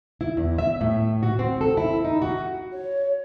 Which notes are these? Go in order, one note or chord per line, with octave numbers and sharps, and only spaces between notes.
E4
E2
E5
A2
F#4
C4
A4
E4
D#4
F#4
C#5